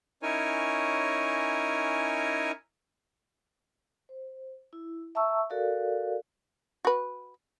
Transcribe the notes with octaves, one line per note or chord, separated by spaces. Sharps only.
C#4 D#4 E4 A#4 C#5 G#5
C5
E4
E5 A5 A#5 C#6 E6
F#4 A4 A#4 D5 F5
F#4 B4